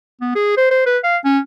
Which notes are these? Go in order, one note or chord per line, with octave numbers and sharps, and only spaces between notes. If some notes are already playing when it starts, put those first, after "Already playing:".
B3
G#4
C5
C5
B4
F5
C#4